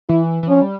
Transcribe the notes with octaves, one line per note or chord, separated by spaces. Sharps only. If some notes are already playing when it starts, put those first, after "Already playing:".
E3 E4
E3
F3 C#4
G3